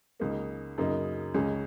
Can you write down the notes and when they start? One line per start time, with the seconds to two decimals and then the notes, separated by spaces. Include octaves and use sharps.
0.20 C#2 C#3 A#3 D#4
0.78 F#2 C#3 A#3 D#4
1.34 C#2 C#3 G#3 C#4